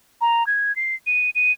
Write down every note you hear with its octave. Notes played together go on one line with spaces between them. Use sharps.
A#5
G#6
C7
D#7
D#7